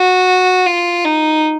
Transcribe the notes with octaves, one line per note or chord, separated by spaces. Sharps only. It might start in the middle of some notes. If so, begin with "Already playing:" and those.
Already playing: F#4
F4
D#4